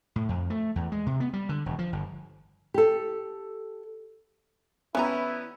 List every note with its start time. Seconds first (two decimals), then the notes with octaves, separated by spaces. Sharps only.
0.16 A2
0.29 F2
0.50 A3
0.76 E2
0.92 G#3
1.06 C3
1.20 B3
1.33 G3
1.49 D3
1.66 E1
1.79 F3
1.93 G1
2.74 G4 A4
4.95 E3 G3 B3 C#4 E4 A#5